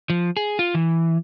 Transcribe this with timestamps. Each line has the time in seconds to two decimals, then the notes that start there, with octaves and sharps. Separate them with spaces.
0.10 F3
0.37 G#4
0.59 F4
0.74 E3